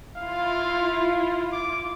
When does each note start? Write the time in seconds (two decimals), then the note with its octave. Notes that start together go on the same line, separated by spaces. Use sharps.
0.16 E4 F4 F5
1.52 D6